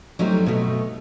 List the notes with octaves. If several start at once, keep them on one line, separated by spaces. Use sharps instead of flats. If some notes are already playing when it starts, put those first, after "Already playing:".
F#3 G3 A3 C4 D#4 F#4
B2 A3